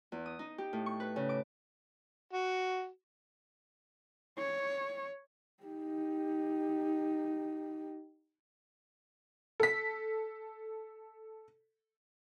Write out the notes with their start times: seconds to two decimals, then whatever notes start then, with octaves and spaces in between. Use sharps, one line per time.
0.12 E2
0.26 D#6
0.39 D#4
0.58 G4
0.73 A2
0.86 C#6
1.00 B4
1.16 C#3
1.29 D6
2.33 F#4
4.38 C#5
5.64 D#4 G4
9.60 A4 B6